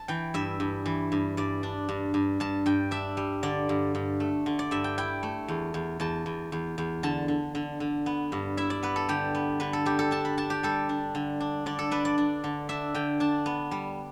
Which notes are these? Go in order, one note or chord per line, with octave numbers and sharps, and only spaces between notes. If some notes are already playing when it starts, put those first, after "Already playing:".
Already playing: A5
E3 G5
G2 E5
G2
E3
G2
G2 D5
D4
G2
G2
G2 A5
G2 G5
D4 E5
G3
D3 D5
G2
G2
A3
D3
D5
G2 E5
G5
E4 G5
A3
E2
E2
E2 A5
E2
E2
E2
D3 A5
D3
D3
D3
B3
G2
E4 E5
D5
B3 B4
A4
D3 G4
B3
D3 B4
A4
G3 G4
A4
D4 A5
B5
D4 A5
G4
G3 A4
D4
D3
D4
D3 D5
A4
D4 B4
D5
D4
D3
D4 E5
D3 G5
D4 A5
B3
G3